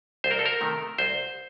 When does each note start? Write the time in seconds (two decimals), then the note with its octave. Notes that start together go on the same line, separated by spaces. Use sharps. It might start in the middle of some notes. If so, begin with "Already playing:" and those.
0.24 C2 C5
0.31 A#4
0.39 A4
0.45 A#4
0.61 C3 D#3 A3
0.98 C2 C5